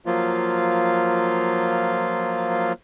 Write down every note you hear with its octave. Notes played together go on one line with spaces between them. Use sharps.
F3 F#3 A#3 F4